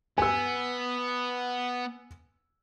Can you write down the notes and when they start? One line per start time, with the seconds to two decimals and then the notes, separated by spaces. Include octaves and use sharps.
0.18 B3 G#5 E6